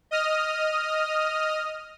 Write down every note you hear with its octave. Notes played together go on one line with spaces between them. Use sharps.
D#5 D#6 F6